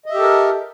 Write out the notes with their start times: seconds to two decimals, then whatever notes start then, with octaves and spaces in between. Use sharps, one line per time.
0.06 D#5
0.10 E5
0.14 G4
0.18 A4
0.22 A#4